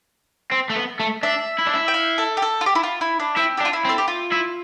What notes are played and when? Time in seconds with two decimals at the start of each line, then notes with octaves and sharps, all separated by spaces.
0.52 C4
0.70 A3
0.76 B3
1.00 A3
1.23 D4 E5
1.58 E4
1.66 D4
1.74 E4
1.88 G5
1.94 F5
2.18 A4
2.37 G4
2.42 A4
2.61 F4
2.66 G4
2.75 E4
2.83 F4
3.01 E4
3.19 D4
3.37 C4 E4
3.57 G4
3.61 D4
3.65 F4
3.73 E4
3.85 C4
3.89 A4
3.98 G4
4.08 F4
4.32 E4